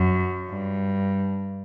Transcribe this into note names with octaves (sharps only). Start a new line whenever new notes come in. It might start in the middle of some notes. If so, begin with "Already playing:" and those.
Already playing: F#2
G2